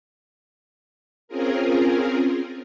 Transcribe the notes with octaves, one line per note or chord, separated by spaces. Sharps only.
C4 C#4 F4 G#4 A#4